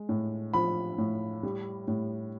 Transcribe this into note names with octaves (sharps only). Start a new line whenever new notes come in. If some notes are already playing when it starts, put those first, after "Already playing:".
Already playing: G#3
A2
F3 B5
A2
G3
A2